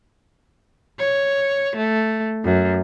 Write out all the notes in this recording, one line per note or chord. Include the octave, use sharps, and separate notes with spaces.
C#5
A3
F#2